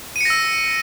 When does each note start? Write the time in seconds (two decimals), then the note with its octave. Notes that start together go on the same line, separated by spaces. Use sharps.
0.16 D#7
0.21 C#7
0.25 A#6
0.30 E6